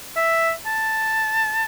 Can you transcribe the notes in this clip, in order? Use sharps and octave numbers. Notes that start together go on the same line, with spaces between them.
E5
A5